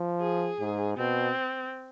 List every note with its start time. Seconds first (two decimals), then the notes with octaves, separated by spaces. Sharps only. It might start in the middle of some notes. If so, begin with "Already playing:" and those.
Already playing: F3
0.21 G#4
0.60 G#2
0.97 B2 C4